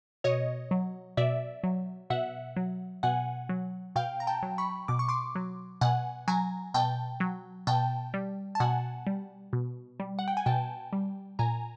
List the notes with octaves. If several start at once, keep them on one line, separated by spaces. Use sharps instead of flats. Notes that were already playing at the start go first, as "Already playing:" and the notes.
B2 C#5 D#5
F#3
B2 D5 E5
F#3
B2 E5 F#5
F#3
B2 F#5 G#5
F#3
B2 F5 G5
A#5
G5 A5
F#3
B5 C#6
B2 D6
C#6
C6 D6
F#3
B2 F#5 G#5
F#3 G#5 A#5
B2 G5 A5
F#3
B2 G5 A5
G3
A5
B2 F#5 G#5
G3
B2
G3
F#5
G5
G#5
B2 G5 A5
G3
A#2 G#5 A#5